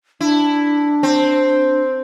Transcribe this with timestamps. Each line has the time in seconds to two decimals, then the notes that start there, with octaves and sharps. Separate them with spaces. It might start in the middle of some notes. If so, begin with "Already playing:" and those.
0.21 D4 E4
1.03 C4